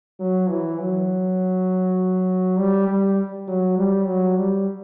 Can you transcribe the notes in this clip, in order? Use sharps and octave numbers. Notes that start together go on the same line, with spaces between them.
F#3
E3
F#3
G3
G3
F#3
G3
F#3
G3